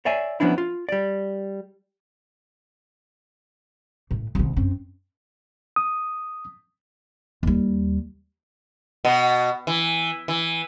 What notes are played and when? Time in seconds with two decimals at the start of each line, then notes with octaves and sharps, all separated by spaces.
0.05 C#5 D5 E5 G#5
0.40 F3 B3 C#4 D4 E4
0.58 F4
0.89 G3 D5
4.11 A2
4.35 C2 D#3
4.56 F#2 C4
5.76 D#6
7.43 D#2 G3
9.05 B2
9.67 E3
10.28 E3